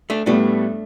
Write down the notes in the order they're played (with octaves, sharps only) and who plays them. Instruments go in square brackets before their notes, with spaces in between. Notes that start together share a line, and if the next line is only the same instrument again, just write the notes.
[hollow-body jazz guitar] A3 D4
[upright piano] A2 G3 B3 [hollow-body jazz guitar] A3 D4